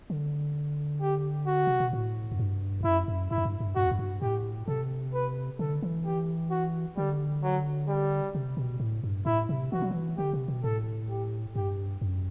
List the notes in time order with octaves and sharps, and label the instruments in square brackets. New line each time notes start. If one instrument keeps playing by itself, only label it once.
[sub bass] D3
[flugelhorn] G4
F#4
[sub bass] C3
B2
A2
F#2
G2
E2
[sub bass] F#2 [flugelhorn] E4
[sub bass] F#2
[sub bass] G2 [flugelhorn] E4
[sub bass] F#2
G2
G2
[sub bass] F#2 [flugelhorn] F#4
[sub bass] E2
F#2
G2
[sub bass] A2 [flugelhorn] G4
[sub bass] C3 [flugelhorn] A4
[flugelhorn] B4
[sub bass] D3 [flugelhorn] A4
[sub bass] E3
[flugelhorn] G4
F#4
[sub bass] D3 [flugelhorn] G3
[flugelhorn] F#3
G3
[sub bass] C3
B2
A2
G2
[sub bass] A2 [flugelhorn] E4
[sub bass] C3
[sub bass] E3 [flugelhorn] F#4
[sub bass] F#3
E3
[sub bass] D3 [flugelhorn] G4
[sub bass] C3
B2
[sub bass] A2 [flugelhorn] A4
[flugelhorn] G4
[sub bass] G2 [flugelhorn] G4
[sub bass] F#2